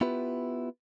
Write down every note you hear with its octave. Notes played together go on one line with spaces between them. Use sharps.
B3 E4 F4 G4 B4